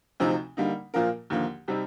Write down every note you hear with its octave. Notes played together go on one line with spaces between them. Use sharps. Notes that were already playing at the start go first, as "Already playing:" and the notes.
D2 C3 F3 C4 D#4
D3 G3 A#3 D#4
A#2 F3 A#3 F4 A#4
D#2 D3 F3 A#3
C3 G3 C4 D#4